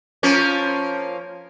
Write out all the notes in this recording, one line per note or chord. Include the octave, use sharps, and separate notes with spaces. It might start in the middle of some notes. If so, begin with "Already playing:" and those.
F3 A#3 C#4